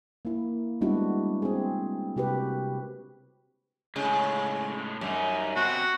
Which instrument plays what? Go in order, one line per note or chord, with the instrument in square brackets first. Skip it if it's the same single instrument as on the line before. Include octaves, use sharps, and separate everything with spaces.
[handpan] A#3 E4
G3 G#3 B3 D4 E4 F#4
C4 G#4
C3 F#4 G4 A#4 B4
[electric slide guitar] A2 G#3 [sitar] C#3
[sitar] F#2 [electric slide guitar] G3 D#4
[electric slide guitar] B2 C4 [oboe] F#4